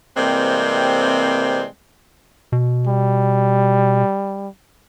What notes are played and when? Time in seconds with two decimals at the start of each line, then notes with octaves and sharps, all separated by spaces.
0.17 C3 E3 G3 G#3 A#3 C4
2.52 B2
2.87 G3